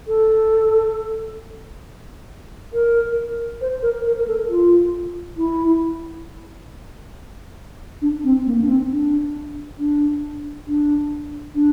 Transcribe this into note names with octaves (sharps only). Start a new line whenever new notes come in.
A4
A#4
C5
A#4
A#4
A#4
A4
F4
E4
D4
C4
A#3
D4
C4
D4
D4
D4
D4